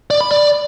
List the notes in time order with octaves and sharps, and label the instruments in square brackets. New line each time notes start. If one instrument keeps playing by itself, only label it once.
[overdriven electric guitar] D5
B5
D5